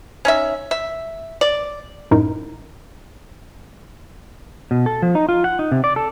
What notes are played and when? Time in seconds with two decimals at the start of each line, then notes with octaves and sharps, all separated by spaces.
0.25 C#4 D#4 E5
0.71 E5
1.41 D5
2.11 F#2 A2 D#4 A#4
4.71 B2
4.86 A4
5.02 F3
5.15 D#4
5.29 F4
5.44 F#5
5.59 D#4
5.72 C3
5.84 D5
5.96 A4